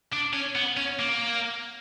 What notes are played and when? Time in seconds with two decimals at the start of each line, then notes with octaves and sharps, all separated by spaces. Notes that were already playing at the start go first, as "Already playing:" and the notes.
0.13 D4
0.33 C#4
0.55 B3
0.77 C#4
0.99 A#3